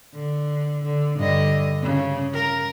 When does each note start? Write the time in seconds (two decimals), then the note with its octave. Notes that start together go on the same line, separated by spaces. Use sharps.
0.14 D3
0.84 D3
1.17 G2 D3 D#5
1.82 C#3
2.33 A#4